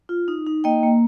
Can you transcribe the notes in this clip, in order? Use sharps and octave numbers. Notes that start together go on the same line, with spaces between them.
F4
D#4
D#4
A#3 D#5 G5
A#3